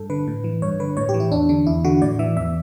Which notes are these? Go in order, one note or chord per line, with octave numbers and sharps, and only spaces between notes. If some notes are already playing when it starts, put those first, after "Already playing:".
Already playing: G2 A4
D3 B4
A2
E3
G2 C#5
D3 B4
A2 C#5
G4
E3
E4
E2 D4
D3 D4
E2 E4
D3 F#4
A2 D5
E3 E5
E2 E5